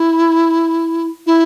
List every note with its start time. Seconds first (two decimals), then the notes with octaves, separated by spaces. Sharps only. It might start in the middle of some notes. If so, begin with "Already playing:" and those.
Already playing: E4
1.26 E4